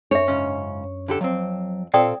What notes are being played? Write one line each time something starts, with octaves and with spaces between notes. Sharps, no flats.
F#2 D4 C#5 E5
C#2 G#2 C#4
D3 G4 A4
F2 F#3 C4
A#2 C4 F4 A4 D5 G5 D#6